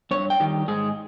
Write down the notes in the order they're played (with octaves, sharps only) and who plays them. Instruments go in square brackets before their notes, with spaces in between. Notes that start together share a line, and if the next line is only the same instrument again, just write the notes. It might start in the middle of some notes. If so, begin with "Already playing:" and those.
[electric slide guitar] G2 C#5
G5
D#3 G3
G#2 G#4